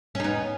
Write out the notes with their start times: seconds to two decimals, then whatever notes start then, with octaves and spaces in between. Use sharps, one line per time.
0.15 C#4
0.20 D#4
0.24 B3